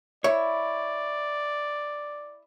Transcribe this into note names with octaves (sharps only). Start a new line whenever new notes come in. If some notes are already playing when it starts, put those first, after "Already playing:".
E4 C#5 D5